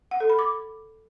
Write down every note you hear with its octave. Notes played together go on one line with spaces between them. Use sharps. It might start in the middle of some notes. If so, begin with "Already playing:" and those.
F#5
A4
B5
D6